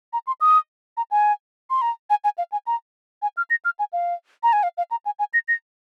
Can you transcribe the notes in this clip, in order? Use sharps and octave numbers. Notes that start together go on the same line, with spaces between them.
A#5
C6
D#6
A#5
G#5
C6
A#5
G#5
G#5
F5
G#5
A#5
G#5
F6
A#6
F6
G#5
F5
A#5
G#5
F5
F5
A#5
G#5
G#5
A#6
A#6